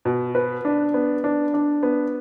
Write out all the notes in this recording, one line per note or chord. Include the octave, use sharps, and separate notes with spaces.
B2
B4
D4
B3
D4
D4
B3